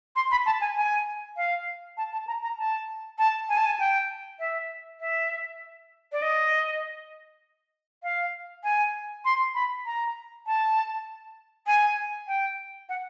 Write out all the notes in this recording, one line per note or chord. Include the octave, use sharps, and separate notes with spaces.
C6
B5
A5
G#5
G#5
F5
A5
A5
A#5
A#5
A5
A5
G#5
A5
G#5
G5
E5
E5
D5
D#5
F5
G#5
C6
B5
A#5
A5
G#5
G5
F#5